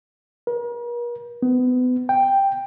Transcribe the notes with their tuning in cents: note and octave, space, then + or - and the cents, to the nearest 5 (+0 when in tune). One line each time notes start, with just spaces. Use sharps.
A#4 +45
B3 +30
G5 +5